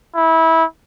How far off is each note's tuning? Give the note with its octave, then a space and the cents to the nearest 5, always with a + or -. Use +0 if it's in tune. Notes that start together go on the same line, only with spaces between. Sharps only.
E4 -20